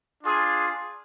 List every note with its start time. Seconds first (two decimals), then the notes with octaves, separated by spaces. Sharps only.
0.24 D4 F4 G#4